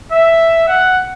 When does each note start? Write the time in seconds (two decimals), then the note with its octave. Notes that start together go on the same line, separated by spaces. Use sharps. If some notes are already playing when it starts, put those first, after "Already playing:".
0.12 E5
0.68 F#5